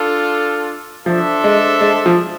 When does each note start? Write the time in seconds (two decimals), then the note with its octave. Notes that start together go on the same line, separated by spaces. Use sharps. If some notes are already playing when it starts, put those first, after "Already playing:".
Already playing: D4 F4 A4
1.06 F3 D4 A4 C5 E5
1.44 G#3
1.81 G#3
2.06 F3